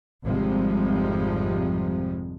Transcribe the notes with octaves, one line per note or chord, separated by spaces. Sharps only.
G#1 F2 C3 F3 G3 G#3